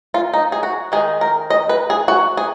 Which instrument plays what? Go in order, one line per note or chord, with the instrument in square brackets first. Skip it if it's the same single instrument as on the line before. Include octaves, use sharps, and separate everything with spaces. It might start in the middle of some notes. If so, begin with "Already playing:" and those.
[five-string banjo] F4
D#4
G#4
F#4
D#3 G#3 D#4 G#4
A#4
D#5
B4
G#4
F#4
G#4